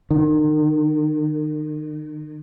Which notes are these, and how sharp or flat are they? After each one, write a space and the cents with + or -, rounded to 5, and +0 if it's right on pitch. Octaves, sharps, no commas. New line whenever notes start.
D#3 -35